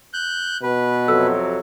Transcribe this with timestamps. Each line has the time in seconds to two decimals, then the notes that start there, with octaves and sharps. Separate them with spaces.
0.14 F#6 G6
0.63 B2 B4
1.08 F2 C3 F#3 A4 E6